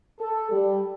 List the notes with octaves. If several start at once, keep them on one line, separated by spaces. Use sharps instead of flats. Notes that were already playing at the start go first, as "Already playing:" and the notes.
A4
G3